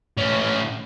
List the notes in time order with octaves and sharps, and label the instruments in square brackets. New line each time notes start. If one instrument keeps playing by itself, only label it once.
[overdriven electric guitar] A2 C#4